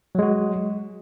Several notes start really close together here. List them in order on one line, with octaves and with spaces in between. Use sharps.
F#3 G#3 F#4